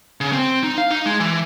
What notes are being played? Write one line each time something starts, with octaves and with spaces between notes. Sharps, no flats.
C#3
C4
D#4
F5
D#4
G#3
E3